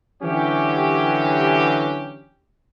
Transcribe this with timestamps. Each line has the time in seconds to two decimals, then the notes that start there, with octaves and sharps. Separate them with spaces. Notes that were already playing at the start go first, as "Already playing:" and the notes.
0.23 D3 E3 F#3 C#4 G4